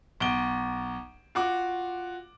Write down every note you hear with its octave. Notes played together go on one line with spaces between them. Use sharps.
B1 D7 G7
F4 F#4 D6